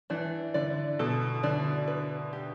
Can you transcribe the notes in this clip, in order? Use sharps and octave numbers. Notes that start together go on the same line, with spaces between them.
E3 D4
D3 D5
B2 A4
D3 D4
B4
G4